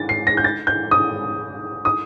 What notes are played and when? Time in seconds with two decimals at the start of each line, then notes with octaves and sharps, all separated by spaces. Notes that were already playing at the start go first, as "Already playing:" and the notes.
Already playing: A6
0.09 C7
0.27 A#6
0.37 G6
0.44 A6
0.67 G6
0.91 D#6
1.85 D#6